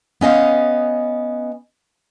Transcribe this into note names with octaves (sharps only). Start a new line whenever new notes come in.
B3 C#4 D#5 F5